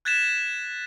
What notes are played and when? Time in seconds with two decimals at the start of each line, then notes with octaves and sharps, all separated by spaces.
0.05 F#6 G#6 A6 B6 E7